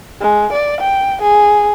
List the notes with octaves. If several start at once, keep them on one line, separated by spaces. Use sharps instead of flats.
G#3
D5
G5
G#4